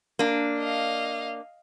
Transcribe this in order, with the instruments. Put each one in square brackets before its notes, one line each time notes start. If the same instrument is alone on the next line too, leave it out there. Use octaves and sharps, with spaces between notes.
[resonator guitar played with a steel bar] A#3 D4
[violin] D#5 F5